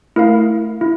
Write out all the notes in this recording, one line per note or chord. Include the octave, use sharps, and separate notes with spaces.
A3 E4 A#4 F5
E4